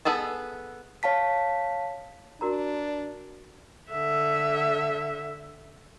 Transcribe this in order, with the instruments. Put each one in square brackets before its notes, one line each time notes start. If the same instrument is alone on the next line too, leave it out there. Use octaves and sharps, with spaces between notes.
[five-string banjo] B3 G#4 A4 A5
[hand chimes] C#5 F5 A5 B6
[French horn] D4 [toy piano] F#4 A#4 A#5
[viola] D3 E5